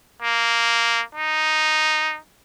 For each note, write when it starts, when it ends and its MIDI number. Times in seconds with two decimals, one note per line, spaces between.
0.23 1.02 58
1.15 2.18 63